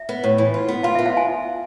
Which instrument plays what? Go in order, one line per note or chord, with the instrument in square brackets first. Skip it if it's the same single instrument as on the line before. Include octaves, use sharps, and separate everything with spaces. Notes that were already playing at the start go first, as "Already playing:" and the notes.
Already playing: [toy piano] E5
[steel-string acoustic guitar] B3
A2
E3
F4
B3
[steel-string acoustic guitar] F4 [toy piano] F5
[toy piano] E5
[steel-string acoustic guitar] B3
[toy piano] F5
G#5